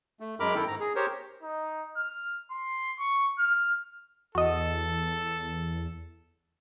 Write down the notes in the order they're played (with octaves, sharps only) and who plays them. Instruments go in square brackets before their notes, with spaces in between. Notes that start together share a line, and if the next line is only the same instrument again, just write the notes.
[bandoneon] A3
F#2 G#3 A#4 B5 D6 F6
D#3 E4 A4 G5
G#2 A#5
G#4
G4 A#4 C5 C#5
[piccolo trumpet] D#4
F6
C6
C#6
F6
[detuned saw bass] E2 [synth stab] F#4 D#5 [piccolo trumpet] A4